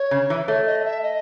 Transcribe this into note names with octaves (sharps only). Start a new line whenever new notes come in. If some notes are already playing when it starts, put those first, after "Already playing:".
Already playing: C#5
C#3
E3
A3 C#5
D#5
D#5
E5
D#5